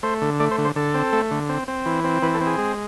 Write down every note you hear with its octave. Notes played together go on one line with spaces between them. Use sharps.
A3 C5
D3
A3 D5
C5
D3
C5
D3 A4
C4
A3
D3
C4
C4
E3
C4
E3 B4
A4
C4
G#4
G#3